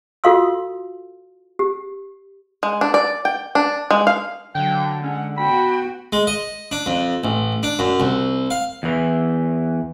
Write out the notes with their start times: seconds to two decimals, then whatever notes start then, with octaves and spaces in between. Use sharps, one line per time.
0.24 F4 F#4 A4 F5 C6 E6
1.59 G4
2.63 G#3
2.81 D4
2.94 D5
3.25 G5
3.55 D4
3.91 G#3
4.07 F5
4.55 D3 F#3 G5
5.03 G#3 C#4 F#5
5.37 B3 F#4 G5 B5
6.13 G#3
6.27 D#5
6.72 D4
6.86 F2
7.24 A1
7.63 D4
7.79 F#2
8.00 C2
8.51 F5
8.83 E2 E3